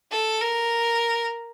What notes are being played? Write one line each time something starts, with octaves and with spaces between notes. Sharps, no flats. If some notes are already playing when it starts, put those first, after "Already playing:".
A4
A#4